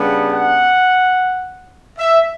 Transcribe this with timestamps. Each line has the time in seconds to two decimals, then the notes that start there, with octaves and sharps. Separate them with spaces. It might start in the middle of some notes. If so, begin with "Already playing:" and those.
Already playing: C#3 G3 B3 D4
0.28 F#5
1.98 E5